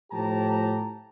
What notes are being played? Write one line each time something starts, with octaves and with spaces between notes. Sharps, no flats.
A2 F3 G4 A5 A#5